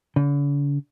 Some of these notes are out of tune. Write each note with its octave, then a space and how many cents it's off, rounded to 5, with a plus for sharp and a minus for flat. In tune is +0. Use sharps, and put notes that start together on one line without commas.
D3 -45